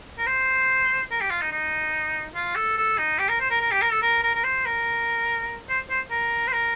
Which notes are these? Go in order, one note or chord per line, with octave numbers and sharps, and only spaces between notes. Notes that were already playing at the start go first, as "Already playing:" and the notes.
A#4
C5
A#4
G4
F4
D#4
D#4
F4
A4
A4
D#4
G4
A#4
C5
A#4
A#4
G4
A#4
A4
A#4
A#4
A#4
C5
A#4
C5
C5
A#4
C5
A#4